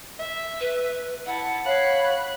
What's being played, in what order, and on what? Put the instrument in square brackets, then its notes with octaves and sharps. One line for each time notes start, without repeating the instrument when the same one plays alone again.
[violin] E5
[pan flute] B4
[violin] E4 A5 [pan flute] F#5
[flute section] C#5 F5 [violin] B5 F#6